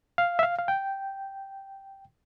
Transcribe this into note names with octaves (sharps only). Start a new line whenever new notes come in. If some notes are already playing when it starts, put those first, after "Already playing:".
F5
E5
F5
F5
G5